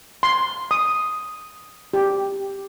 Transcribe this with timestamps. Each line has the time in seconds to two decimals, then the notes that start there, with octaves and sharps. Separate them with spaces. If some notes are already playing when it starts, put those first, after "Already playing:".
0.23 C6
0.71 D#6
1.94 G4